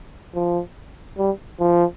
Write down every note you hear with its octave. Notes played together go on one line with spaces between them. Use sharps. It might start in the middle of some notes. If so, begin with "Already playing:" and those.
F3
G3
F3